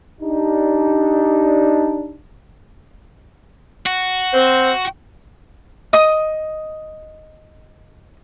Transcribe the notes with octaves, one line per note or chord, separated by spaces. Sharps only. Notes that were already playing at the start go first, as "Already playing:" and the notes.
D4 D#4 G4
F#4
C4 C5
D#5 D#6